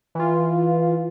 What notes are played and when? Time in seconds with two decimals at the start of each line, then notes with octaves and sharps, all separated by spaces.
0.15 E3 F4